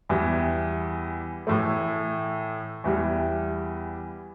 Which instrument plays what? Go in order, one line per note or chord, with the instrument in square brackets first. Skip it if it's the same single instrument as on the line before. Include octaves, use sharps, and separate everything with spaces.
[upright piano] E2 E3 G3
A2 E3 A3
E2 E3 G3